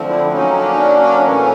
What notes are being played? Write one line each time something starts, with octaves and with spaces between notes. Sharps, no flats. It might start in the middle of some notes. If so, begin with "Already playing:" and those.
Already playing: D3 F3 A3 C4
D4 E4
D3 F#3 A#3 C#4 D#4
D4
D#4
D4
D4
A2 E3 A3 C#4